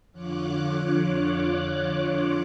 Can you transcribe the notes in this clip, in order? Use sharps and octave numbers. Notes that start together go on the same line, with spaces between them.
F2 D3 F4 C#5 D6 F#6